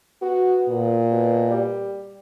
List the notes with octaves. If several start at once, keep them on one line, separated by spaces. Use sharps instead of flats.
B3 F#4
A#2
B2
G3